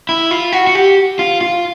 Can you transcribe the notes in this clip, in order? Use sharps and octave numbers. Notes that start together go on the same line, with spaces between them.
E4
F4
F#4
F#4
G4
F4
F4